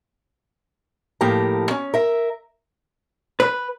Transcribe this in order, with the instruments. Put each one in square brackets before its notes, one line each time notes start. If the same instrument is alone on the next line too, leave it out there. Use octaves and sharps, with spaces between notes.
[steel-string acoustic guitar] A2 F3 A#3 G4 A#5
C#4
A#4 E5
[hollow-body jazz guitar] B4